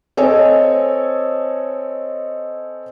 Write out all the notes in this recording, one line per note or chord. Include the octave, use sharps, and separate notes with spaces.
C4 A4 C#5 D#5 G#5